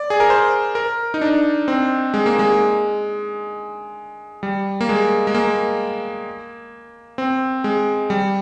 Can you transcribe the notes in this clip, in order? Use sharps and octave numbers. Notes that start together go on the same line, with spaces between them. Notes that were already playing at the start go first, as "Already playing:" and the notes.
Already playing: D5
G#4
A#4
C5
A#4
D#4
D4
C4
G#3
A#3
G#3
G3
A#3
G#3
G#3
A#3
C4
G#3
G3